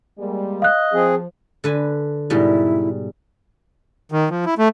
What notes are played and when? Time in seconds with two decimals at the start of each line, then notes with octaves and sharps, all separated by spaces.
0.19 G3 G#3 A#3
0.62 D#5 F5 F#6
0.93 F3 C4 G#4
1.64 D3 B4 G#5
2.30 G#2 B2 G3 E4
4.12 D#3
4.30 F3
4.45 E4
4.58 A3